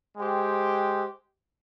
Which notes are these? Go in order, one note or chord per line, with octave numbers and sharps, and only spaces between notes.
G#3 G4 C5 G5